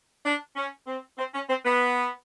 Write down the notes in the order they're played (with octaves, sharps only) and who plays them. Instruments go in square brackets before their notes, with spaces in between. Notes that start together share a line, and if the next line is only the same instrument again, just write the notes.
[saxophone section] D4
C#4
C4
C4
C#4
C4
B3